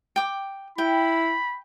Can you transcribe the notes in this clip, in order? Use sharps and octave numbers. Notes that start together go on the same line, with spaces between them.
G5 D6
E4 G5 B5